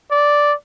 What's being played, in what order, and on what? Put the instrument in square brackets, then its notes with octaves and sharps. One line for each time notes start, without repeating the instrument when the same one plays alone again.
[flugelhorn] D5